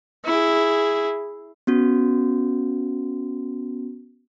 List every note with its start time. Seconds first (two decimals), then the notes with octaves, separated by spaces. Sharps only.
0.25 E4 G#4
1.67 B3 C#4 F#4